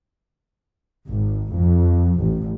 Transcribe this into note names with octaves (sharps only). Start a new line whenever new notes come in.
G#1
F2
A1